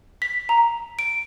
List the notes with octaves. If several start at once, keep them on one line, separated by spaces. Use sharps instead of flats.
B6
A#5
D7